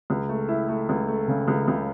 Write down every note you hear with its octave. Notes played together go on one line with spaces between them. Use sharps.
C#2
A3
E4
A3
C#2
A3
C#3
C#2
C#2